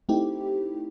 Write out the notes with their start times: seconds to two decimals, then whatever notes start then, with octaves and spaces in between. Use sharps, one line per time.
0.09 A3 C4 D#4 E4 G4